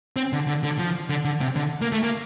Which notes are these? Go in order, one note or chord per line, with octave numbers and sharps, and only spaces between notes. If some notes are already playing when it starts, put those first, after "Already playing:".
C4
D3
D3
D3
F3
D3
D3
C3
D3
A#3
A3
A#3